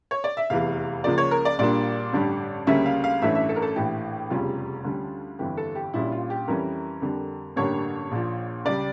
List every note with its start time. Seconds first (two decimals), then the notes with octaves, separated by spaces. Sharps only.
0.11 C#5
0.24 D5
0.37 E5
0.50 F1 E2 E3 F5
1.04 C#2 C#3 F3 A#3 D5
1.18 C#5
1.31 A#4
1.45 D5
1.58 A#1 A#2 G3 A#3 D4 D5
2.13 A1 G2 D3 G3
2.67 D2 C#3 G3 A#3 C#4 E5
2.86 F5
3.04 F5
3.22 A1 G2 E3 A3 C#4 E5
3.35 E5
3.49 A4
3.56 A#4
3.62 A4
3.76 A#1 A2 E3 G4
4.30 F1 E2 C#3 G3 C#4 F4
4.85 D2 D3 G3 C#4
5.39 G1 F2 E3 G3 G4
5.57 A4
5.75 G4
5.93 A#1 A#2 G3 C#4 E4
6.12 F4
6.30 G4
6.48 F2 E3 G3 C#4 A#4
7.02 F2 D3 G3
7.56 A1 G2 D3 G3 A#3 C#5
8.11 A#1 A#2 F3
8.65 C#2 C#3 G3 D5